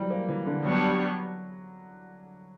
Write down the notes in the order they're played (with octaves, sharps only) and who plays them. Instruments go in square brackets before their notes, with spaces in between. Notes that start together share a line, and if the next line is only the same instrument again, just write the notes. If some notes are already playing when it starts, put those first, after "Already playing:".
Already playing: [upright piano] E3 F#3 G3
A#3
E3
D3
[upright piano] F#3 [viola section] G3 B3 D4 G4 C#5